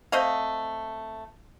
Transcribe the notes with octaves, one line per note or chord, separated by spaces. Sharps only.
A3 C4 D#5 F5